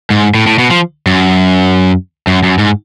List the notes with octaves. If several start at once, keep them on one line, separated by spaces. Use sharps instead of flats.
G#2
A2
A2
B2
F3
F#2
F#2
F#2
G#2